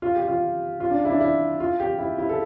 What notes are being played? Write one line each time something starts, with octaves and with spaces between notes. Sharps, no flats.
F4
G4
F4
F4
D4
E4
D4
E4
F4
G4
E4
E4
A4